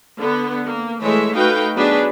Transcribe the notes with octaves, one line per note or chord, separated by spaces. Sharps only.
D3 B3
A#3
E3 G#3 A3 C#5 E5
A3 D#4 F#4 B4 F5 G5
F#3 B3 D4 G#4 B4